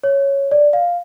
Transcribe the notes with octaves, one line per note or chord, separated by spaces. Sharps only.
C#5
D5
F5